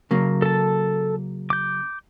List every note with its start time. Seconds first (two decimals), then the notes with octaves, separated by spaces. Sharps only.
0.11 C#3 F#3 A#3
0.42 A4 A5
1.50 D6 G6